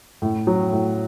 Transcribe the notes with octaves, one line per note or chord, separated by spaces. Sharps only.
A2
F#3
A2